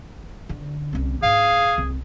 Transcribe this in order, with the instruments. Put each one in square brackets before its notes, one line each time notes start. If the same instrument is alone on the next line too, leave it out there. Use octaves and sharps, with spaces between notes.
[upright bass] D3
C2 C#4
[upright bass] G#2 D4 [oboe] G#4 [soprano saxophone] F5
[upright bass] C2